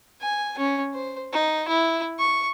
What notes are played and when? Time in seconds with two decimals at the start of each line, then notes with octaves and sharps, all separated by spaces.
0.21 G#5
0.58 C#4
0.94 C5
1.32 D#4
1.68 E4
2.19 C#6